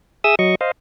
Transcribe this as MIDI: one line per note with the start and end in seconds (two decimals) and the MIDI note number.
0.24 0.35 68
0.24 0.35 76
0.24 0.35 87
0.24 0.35 88
0.39 0.55 54
0.39 0.55 75
0.39 0.55 85
0.61 0.71 72
0.61 0.71 75
0.61 0.71 77